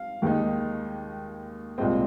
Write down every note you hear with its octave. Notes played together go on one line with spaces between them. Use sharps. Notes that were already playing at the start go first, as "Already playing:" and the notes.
Already playing: F5
D#2 D#3 G#3 D#4
C2 A#2 G#3 C4 D#5